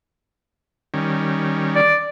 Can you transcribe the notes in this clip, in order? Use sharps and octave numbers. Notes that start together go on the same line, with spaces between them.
D#3 G3 C#4
D5